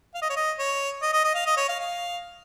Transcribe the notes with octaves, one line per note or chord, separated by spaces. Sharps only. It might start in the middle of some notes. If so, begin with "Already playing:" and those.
F5
D#5
C#5
D#5
C#5
D#5
D#5
D#5
F5
D#5
C#5
F5
F5